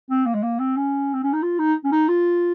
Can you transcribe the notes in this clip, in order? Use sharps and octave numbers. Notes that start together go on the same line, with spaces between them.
C4
A#3
G#3
A#3
C4
C#4
C4
C#4
D#4
F4
D#4
C#4
D#4
F4